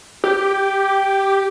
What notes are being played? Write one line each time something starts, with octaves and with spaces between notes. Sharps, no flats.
G4